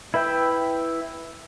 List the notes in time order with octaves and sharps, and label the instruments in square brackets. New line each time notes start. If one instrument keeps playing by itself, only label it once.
[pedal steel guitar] E4 B4 E5 G5